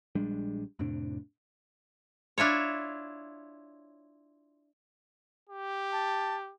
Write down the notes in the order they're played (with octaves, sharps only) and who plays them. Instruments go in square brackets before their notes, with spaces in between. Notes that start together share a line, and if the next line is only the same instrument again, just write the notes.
[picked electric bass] A#1 G3 G#3 D4
F2 A2 C3 D4
[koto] D4 E4 F4 C#5
[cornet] G4
[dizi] A5